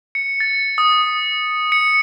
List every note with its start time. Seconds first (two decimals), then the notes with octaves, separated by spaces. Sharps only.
0.15 C#7
0.40 A6
0.78 D#6
1.72 C#7